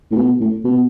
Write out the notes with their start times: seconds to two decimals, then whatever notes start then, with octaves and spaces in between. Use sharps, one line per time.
0.11 A2
0.16 B2
0.40 A2
0.65 B2